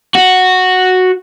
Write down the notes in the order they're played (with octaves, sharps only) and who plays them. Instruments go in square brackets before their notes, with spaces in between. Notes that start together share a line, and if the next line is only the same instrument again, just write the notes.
[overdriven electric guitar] F#4